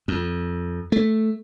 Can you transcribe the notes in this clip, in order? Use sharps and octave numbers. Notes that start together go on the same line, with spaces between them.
F2
A3